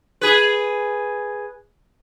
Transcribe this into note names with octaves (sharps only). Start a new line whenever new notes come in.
G#4 B4